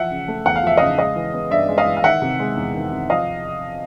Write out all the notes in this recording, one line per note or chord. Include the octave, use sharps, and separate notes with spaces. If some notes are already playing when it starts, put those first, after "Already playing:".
Already playing: E3 F3 E5 F#5
C#3
A3
E2 F#5
F5
F3 E5
D#5 F5
C#3
G#3 D#5 F5
E3
B3
G2 D5 E5
G#3
D#5 F5
E3
F5
D#3 E5 F#5
C3
G#3
E2
D#3
C3
F3 D#5 F5